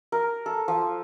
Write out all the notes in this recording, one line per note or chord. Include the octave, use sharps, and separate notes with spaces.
A#4
A4
F3